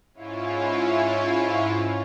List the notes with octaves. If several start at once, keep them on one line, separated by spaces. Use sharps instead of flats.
G#2 C#4 E4 F4